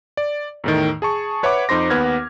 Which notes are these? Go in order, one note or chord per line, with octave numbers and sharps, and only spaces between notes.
D5
E2 A2 D#3
G#4 A5 C#6
B4 C#5 E5 F#5 B5 D6
F2 D#4 C5 C6 A#6
D#2 B3 B4 F#5 F6 G#6